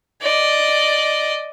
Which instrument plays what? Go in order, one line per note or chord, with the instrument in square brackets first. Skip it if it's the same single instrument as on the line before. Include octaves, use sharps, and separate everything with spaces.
[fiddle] D5 D#5